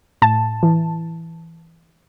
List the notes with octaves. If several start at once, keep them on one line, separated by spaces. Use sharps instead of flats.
A2 A5
E3